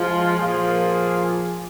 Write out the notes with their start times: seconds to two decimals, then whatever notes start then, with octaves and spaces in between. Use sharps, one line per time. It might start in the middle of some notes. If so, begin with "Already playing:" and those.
Already playing: F3 G#3 F4 G#4
0.36 A#2 F3 A#3 F4 G#4